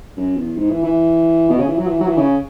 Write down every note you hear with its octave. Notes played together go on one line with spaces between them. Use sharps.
F#2
E2
G#2
E3
E3
B2
C#3
E3
F#3
E3
F#3
E3
C#3